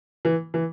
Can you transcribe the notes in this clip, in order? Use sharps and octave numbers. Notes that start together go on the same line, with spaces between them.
E3
E3